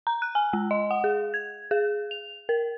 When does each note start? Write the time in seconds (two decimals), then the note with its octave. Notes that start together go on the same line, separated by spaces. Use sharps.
0.07 A#5
0.22 F#6
0.35 G#5
0.53 G#3
0.71 D#5
0.91 F#5
1.04 G#4
1.34 G#6
1.71 G#4
2.11 F7
2.49 A#4